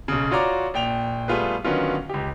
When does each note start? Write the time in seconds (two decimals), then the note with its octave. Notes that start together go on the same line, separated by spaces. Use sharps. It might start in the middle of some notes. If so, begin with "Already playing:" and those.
0.08 B1 C#3
0.31 F4 F#4 C#5 D5 A#5 D6
0.74 A#1 G5 F7
1.28 G3 A3 B3 F4 G#4 B4
1.64 D3 D#3 F#3 B3 C#4 F4
2.09 C#2 G4